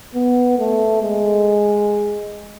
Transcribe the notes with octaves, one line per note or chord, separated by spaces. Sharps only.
B3
A3
G#3